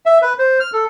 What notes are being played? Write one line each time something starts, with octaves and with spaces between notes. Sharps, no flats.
E5
B4
C5
F6
A4